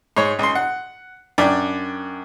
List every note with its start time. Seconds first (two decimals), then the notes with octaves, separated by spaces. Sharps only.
0.17 G#2 C#5
0.39 C#2 C6
0.55 F#5
1.38 F#2 D4 D5 G5